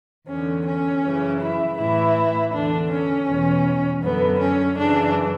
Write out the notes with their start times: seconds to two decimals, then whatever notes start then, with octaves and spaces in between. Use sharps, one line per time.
0.28 E2 D3 C#4
0.65 C#4
1.03 F#2 C#3 E3
1.40 E4
1.78 A2 E3 E4
2.53 E2 D3 D4
2.90 C#4
3.27 E2 B2
4.02 F#2 D3 B3
4.40 C#4
4.77 F#2 C#3 E3 D4